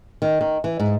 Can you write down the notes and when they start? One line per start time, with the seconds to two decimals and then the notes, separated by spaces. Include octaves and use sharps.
0.22 D#3
0.41 D#3
0.64 E3
0.80 G#2